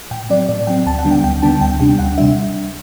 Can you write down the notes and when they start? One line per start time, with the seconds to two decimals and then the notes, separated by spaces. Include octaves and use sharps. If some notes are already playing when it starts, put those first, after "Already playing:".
0.11 A2 G5
0.30 F#3 C4 D5
0.49 A2 D5
0.67 F#3 C4 G5
0.86 D2 A5
0.99 F#5
1.04 D3 G3 B3 D4
1.11 G5
1.24 D2 G5
1.42 D3 G3 B3 D4 A5
1.61 D2 G5
1.80 C3 G3 D4 G5
1.99 D2 F#5
2.18 C3 G3 D4 E5